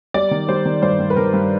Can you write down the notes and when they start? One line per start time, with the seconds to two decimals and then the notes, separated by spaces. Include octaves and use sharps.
0.14 G3 D5
0.31 D#3
0.49 G3 C5
0.65 D#3
0.82 G2 C5
0.99 G2
1.10 B4
1.16 D#3 A#4
1.33 G2